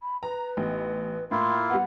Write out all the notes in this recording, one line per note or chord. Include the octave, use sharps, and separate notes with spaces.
B5
B4 A#5
A1 B3 D#4
A2 A#3 E4 F4 C6
G3 B3 F#5